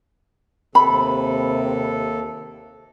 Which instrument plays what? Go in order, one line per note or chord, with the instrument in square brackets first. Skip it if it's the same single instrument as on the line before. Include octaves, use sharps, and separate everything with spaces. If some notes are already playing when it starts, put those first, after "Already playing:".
[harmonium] D#2 A4 [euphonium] C3 [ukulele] B5